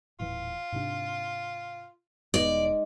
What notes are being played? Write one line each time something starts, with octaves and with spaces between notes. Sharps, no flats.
D#1 A2 E3 F4
G#2 C3 D4
E1 G#3 B3 D#4 D5